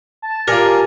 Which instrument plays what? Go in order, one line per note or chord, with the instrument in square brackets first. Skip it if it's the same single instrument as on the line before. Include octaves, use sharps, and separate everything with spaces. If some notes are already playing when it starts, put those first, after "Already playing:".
[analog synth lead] A5
[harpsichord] F4 D5 [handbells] G4 G#5 [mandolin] A#4